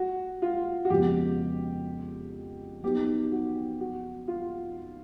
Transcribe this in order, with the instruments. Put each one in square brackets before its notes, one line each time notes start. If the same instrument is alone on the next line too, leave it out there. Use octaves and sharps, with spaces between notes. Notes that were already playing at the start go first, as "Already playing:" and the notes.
Already playing: [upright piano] F#4
F4
F#4
[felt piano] F2 C#3 F3 G#3 B3 [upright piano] G4
[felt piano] F#3 B3 D#4 [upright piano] G4
[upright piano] F#4
F#4
F4